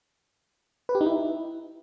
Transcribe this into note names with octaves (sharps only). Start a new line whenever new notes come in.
B4
G4
D#4
E4